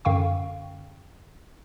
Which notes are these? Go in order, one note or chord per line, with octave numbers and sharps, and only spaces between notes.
F#2 D3 F5 G5 C#6